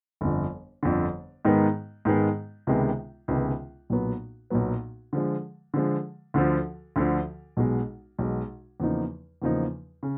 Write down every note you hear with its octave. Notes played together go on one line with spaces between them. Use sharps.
G1 F2 D3
G1 F2 D3
G#2 D#3 G#3 B3
G#2 D#3 G#3 B3
C#2 C3 D#3 G#3 B3
C#2 C3 D#3 G#3 B3
B1 A#2 F#3 B3
B1 A#2 F#3 B3
D3 F3 G#3
D3 F3 G#3
D2 D3 F3
D2 D3 F3
B1 B2 G#3
B1 B2 G#3
E2 C#3 F3 A#3 D#4
E2 C#3 F3 A#3 D#4
C#3